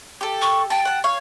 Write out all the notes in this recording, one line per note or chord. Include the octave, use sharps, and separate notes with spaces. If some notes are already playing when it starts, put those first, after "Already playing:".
G4 A4
C#6
G5 A5
F#5 A5
C#5 F5